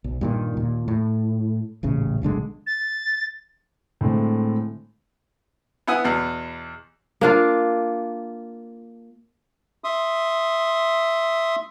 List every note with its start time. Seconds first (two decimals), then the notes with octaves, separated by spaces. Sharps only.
0.04 B1
0.21 G2 A#2 D#3
0.57 D#2 A#2
0.88 A2
1.83 D#1 A1 C#3
2.22 D1 B1 D3 G#3
2.67 A6
4.01 A2 D3 G#3 A3 C4
5.87 B3 E4 F#5 G#5 D#6
6.04 E2 B2
7.21 A#3 D4 F4
9.84 E5 C6 D#6